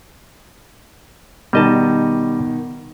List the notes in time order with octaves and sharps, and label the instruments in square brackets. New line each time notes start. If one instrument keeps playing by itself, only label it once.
[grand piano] B2 D#3 [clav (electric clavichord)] G3 D#5 A5